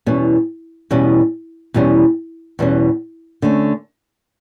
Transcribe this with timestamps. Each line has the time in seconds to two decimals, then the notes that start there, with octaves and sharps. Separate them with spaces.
0.06 E2 B2 G3 C#4
0.91 E2 B2 G3 C#4
1.74 E2 B2 G3 C#4
2.59 E2 B2 G3 C#4
3.42 D3 A3 C#4